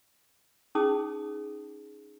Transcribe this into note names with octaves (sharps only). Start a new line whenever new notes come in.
C#4 D#4 G#4 A5 D#6